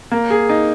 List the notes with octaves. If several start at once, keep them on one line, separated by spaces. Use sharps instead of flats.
A#3
G#4
D#4